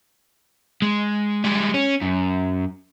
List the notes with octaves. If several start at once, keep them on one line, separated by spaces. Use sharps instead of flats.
G#3
G3 G#3
C#4
F#2